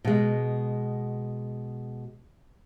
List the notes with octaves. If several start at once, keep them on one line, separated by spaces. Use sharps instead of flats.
B2 G#3